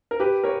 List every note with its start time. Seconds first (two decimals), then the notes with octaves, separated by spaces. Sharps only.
0.11 A#4
0.20 G4 B4
0.44 A#4 C#5